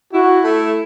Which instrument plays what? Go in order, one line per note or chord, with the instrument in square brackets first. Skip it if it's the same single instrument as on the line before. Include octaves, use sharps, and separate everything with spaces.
[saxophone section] E4 [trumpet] F#4
[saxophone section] A3